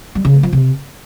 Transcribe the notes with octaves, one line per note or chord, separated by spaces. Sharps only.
G3
C#3
A3
F3
C3